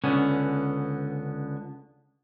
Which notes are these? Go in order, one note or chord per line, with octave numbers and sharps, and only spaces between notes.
C#2 D3 B3 C#4 G#5